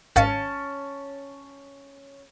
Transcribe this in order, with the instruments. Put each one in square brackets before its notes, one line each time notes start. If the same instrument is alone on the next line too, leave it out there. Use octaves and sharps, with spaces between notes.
[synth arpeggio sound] G#1 F5 [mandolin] C#4 A5